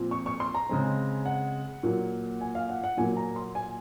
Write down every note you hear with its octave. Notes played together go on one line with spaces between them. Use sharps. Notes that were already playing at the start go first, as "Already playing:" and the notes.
Already playing: A#2 F3 C4
C#6
C#6
C6
A#5
C#3 G#3 C4
F#5
A#2 F#3 A#3
G#5
F5
F#5
F#5
A#2 F#3 A#3 G#5
A#5
C6
G#5